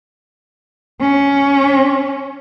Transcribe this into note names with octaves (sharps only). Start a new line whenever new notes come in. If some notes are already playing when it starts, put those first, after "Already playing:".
C#4